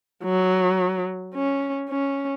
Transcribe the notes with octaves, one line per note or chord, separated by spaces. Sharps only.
F#3
C#4
C#4